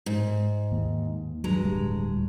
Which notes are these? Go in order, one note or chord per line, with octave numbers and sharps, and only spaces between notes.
G#2
D#2
G2 F#3 G#3 A#5
D1 G3